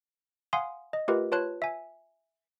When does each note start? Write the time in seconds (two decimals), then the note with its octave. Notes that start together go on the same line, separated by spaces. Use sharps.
0.53 F5 F#5 G#5 C6 D#6
0.93 D#5
1.08 A3 F4 G4 A#4 B4 D#5
1.32 F4 B4 C#5 A5 C6 F#6
1.62 E5 G#5